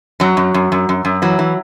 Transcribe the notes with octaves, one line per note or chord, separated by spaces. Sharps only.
F#2 F#3
F#2
F#2
F#2
F#2
F#2
E3 F#3
E3